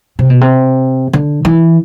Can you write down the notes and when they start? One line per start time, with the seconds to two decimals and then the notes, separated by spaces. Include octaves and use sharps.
0.19 C3
0.30 B2
0.41 C3
1.13 D3
1.45 E3